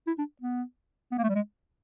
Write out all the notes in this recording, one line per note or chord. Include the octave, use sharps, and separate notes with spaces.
E4
D4
B3
B3
A#3
A3
G3
G#3